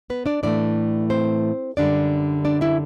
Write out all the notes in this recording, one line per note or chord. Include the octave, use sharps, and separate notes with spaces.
B3 B4
D4 D5
A2 E3 A3 D4 D5
C4 C5
F#2 D3 G3 D4 D5
D4 D5
E4 E5